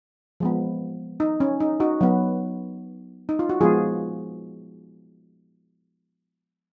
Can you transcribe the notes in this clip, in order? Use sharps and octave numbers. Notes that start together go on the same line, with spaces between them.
F3 G#3 B3
D#4
C#4
D#4
D#4 F#4
F#3 B3
D#4
F4
F#4
F3 G#3 B3 F4 G#4